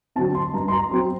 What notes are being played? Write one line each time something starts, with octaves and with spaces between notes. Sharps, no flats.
D3 F#3 C4 A5
C6
G2 A#5
C6
A#5
F#3 C4 C6